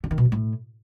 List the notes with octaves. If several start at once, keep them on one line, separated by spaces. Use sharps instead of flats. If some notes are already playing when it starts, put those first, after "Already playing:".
D3
D#3
B2
D3
A2